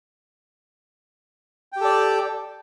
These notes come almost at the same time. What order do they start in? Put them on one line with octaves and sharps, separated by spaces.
G5 G4 A4 D5